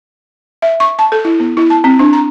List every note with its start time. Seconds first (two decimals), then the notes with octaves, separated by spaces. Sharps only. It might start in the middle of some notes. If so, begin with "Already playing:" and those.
0.62 E5
0.80 C#6
0.99 A5
1.12 A4
1.25 E4
1.40 B3
1.57 E4
1.70 A5
1.84 C4
1.99 D4
2.13 A#5